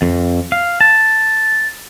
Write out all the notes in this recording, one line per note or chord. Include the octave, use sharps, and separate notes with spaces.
F2
F5
A5